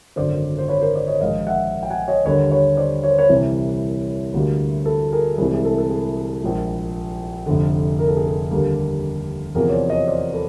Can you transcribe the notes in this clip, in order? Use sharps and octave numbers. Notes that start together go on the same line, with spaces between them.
G#1 F#2 D3 C5 D5
C5
B4 C#5
A#4 C5
C5 D5
C#5 D#5
A#1 G#2 D#3 G#3 D#5 F5
E5 F#5
G5
F#5 G#5
C#5 D#5
D#2 D3 G3 A#3 B4 C#5
B4 C#5
C5 D5
C#5
C5
B4 C#5
C2 C3 E3 G3
D2 D3 G3 A#3
A4 B4
G#4 A#4
C2 C3 E3 G#3 G#4
G#4
A4
A4
G#4
A#1 A#2 F3 G#3
F1 F2 D3
A#4
A4
G#4
A4
D#2 D3 G3 A#3
E2 C3 F3 A#3 G#4 A#4
C#5
C5 D5
C#5 D#5
C5 D5
A4 B4